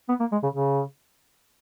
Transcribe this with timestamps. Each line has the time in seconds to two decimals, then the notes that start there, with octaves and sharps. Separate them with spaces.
0.09 B3
0.20 A#3
0.32 G#3
0.43 C#3
0.54 C#3